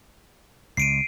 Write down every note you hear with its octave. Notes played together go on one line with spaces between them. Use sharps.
C#2 C7 D7 D#7